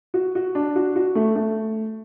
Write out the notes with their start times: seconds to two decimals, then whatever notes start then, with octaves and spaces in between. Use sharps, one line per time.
0.14 F#4
0.35 F#4
0.55 D4
0.76 F#4
0.96 F#4
1.15 A3
1.36 A3